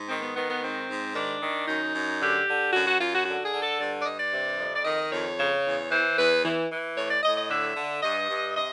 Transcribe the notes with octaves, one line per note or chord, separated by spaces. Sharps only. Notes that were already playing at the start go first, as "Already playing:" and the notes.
Already playing: G#2
D#3 C4
B3
D#3 B3
B3
G#2 C4
G#2
D#3 D4
D#3
F#2 D#4
F#2
D3 G4
D3
F#2 F#4
F#4
F#2 F4
F#4
D3 F#4
G#4
D3
A4
G2 D5
D5
G2 D#5
D5
C3
F2
D5
D#3 D#5
F2 C#5
C#3
E2
E3 C5
E2 B4
E3
E3
A2 C#5
D5
A2 D#5
D#5
D3 E5
D3
G2 D#5
G2
C3 D#5